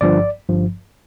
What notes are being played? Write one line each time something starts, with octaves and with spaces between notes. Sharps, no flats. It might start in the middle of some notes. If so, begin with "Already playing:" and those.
G1 G2 F3 D5
G1 G2 F3